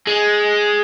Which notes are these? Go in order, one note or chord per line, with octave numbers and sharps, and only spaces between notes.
G#3